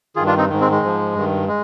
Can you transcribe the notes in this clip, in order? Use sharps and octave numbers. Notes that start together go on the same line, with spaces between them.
G2 D#3 F4 G#4
D4 F4
C4 D#4
G#2 D#3
G#3 C4
G#3
G#2 F3
G2 D#3
G#3